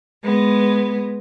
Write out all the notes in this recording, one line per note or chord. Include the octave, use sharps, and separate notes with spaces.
G#3 B3